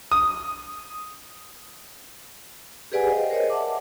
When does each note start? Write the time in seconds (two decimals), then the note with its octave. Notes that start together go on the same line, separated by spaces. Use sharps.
0.12 D#6
2.92 G4 G#4 B4 D5 F#5 G#5
3.10 C5 D#5 F5 G5
3.30 A#4 C5 C#5 D#5
3.50 E5 F#5 A5 D6